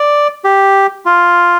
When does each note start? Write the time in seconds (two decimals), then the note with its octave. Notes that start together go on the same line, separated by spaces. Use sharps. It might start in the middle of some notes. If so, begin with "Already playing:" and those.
Already playing: D5
0.44 G4
1.06 F4